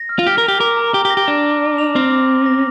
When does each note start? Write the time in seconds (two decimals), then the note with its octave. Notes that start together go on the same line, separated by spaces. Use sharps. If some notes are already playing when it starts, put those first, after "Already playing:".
Already playing: A#6
0.09 F6
0.19 F4
0.26 G4 F6
0.38 A#4
0.43 G4 F7
0.60 A#4 D6
0.77 A#5
0.94 G4 A#5
1.05 G4
1.10 A#6
1.17 G4
1.27 D4 A#6
1.44 D6
1.62 D6
1.78 F7
1.95 C4 F6
2.12 D6
2.29 D6
2.46 A#6